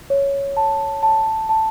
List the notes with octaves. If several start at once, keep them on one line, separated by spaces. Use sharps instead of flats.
C#5
A5
A5
A5